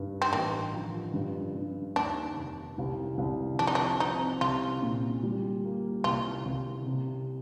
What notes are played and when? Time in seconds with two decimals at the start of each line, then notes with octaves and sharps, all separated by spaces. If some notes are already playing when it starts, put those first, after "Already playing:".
Already playing: G2 D#3
0.22 C4
0.32 A1 A#3
0.73 F3
1.14 G2
1.55 G2
1.96 D#2 D4
2.36 F1
2.78 C2
3.18 C2
3.59 F3 D4
3.67 D#4
3.75 D4
4.00 C4 D#4
4.41 C2 F4
4.82 A#2
5.23 G3
5.64 A#3
6.04 C2 F4
6.46 C2
6.86 C3